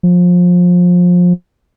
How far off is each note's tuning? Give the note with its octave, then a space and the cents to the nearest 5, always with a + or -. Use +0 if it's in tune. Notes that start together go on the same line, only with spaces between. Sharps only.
F3 +25